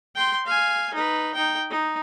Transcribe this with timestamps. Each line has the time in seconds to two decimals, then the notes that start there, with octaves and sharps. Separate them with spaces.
0.15 G5 C6
0.46 F5 G#5
0.94 D#4 B4
1.35 D#4 G5
1.70 D#4